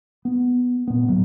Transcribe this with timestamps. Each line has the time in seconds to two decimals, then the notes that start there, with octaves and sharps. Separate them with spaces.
0.25 B3
0.87 A#2 B3
1.07 D2 A2 F#3